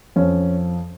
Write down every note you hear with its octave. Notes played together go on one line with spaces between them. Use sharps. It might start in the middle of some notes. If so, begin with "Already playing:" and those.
F2 C#4